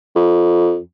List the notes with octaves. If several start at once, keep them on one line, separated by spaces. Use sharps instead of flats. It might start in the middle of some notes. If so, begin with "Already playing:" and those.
F2